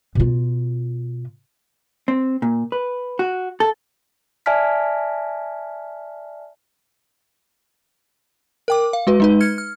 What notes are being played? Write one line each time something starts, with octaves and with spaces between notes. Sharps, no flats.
B2 F4
C4
A#2
B4
F#4
A4
D5 E5 G#5 A5 F6 B6
A#4 G5 D6
F5
G#3 F#4 B4
G#3 D#4 B4
F6 G#6 C#7
F6